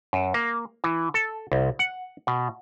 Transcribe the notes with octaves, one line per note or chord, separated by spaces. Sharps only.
F#2
A#3
E3
A4
C2
F#5
B2